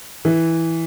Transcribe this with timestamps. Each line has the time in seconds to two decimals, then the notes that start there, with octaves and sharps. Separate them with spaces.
0.25 E3